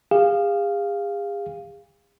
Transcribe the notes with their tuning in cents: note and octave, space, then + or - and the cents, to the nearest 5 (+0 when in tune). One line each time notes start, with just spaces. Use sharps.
G#4 -40 F5 +0